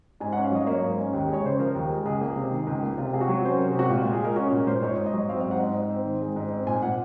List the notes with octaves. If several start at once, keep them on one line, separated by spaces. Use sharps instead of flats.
G#2 G#5
C#4 F#5
F5
F#3 D#5
A#3 C#5
G#2
C#4
D#2
G#3 C#5
C#3 C5
F3 A#4
D#2
G#3
C#2 G#4
A#3
C3
D#3
C#2
A#3
C3 F4
C3 G#4
F#4
F#3
C#4 C5
C3 A#4
G#4
C3 F#4
A#2 F4
A#2 F4
G#4
G#3 A#4
C#4 F#4
A#2 A#4
A#2 C5
G#2 C#5
G#2
D#5
F#3
C4 F5
G#2 F5
F#5
G#2
G#2
C4
D#3
G#3
G#2
C4
A#2 G#5
A#2 F#5